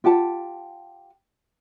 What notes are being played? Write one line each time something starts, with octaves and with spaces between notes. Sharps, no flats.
F4 G4 F#5 A5